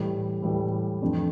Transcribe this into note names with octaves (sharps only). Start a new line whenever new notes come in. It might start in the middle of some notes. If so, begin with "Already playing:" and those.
Already playing: A2 E3 G3
A2 E3 G3
F2 E3 A3 D4